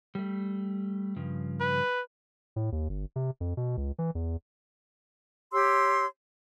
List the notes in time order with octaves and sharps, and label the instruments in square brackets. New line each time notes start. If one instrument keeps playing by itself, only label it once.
[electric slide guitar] G3 A3
G2 C#3 F3
[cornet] B4
[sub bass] A2
D#2
G1
C3
F2
B2
C#2
E3
E2
[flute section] G4 C#5 C6 E6